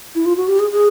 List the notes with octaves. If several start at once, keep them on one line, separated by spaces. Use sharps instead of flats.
E4
F4
F#4
G4
G#4
G#4